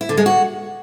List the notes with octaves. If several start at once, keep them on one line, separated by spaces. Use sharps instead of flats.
E4
D3
G#3
F#4